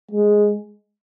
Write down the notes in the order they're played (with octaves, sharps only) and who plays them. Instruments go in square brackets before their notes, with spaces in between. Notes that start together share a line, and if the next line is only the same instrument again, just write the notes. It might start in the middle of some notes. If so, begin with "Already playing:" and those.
[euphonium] G#3